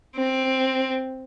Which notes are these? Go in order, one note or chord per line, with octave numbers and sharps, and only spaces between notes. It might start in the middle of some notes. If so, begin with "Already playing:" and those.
C4